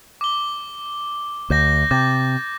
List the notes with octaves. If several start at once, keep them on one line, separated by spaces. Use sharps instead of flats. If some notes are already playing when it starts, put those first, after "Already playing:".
D6 G7
D2 D6 G6 A#6
C3 D6 G6 A6